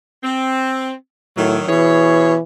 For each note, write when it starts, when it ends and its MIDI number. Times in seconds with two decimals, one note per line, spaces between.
0.24 0.93 60
1.37 1.58 45
1.37 1.68 51
1.37 1.68 54
1.69 2.34 47
1.69 2.41 52
1.69 2.34 68
1.69 2.34 73